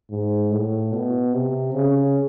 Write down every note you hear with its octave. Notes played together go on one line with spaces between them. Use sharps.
G#2
A2
B2
C3
C#3